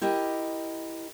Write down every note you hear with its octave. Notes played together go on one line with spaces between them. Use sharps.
E4 G4 A#4 D#5